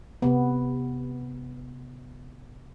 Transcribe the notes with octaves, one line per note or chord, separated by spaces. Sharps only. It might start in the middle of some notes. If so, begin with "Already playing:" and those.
C3 B3